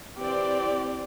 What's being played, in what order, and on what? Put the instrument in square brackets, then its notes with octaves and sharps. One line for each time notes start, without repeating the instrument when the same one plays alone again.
[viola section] E3 C4 D5 [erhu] G4